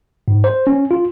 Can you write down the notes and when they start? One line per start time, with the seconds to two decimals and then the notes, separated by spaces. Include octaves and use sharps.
0.28 G#2
0.44 C5
0.67 C#4
0.91 F4